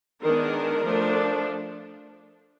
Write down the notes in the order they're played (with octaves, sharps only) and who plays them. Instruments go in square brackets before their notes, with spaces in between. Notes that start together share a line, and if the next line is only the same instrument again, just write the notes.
[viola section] D#3 G#3 B3 D4 A#4
F3 A3 D4